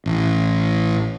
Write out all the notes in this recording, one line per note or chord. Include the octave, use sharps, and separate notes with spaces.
A1